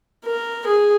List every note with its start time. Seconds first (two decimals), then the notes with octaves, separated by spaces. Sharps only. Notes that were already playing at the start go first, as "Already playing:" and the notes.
0.25 A#4
0.66 G#4